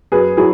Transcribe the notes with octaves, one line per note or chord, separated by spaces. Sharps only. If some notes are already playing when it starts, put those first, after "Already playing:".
F#2 G#4 B4
F#3 E4 G#4